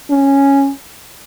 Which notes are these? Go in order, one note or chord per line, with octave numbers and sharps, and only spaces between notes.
C#4